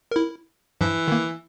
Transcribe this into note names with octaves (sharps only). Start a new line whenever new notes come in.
E4 A#4
G2 E3 F3
D#3 A#3